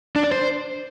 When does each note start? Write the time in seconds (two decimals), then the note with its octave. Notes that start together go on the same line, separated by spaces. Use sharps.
0.16 D4
0.24 D5
0.32 C5